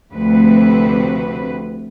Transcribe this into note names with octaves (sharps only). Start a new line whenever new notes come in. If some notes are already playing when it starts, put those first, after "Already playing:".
D2 C3 F3 C4 B4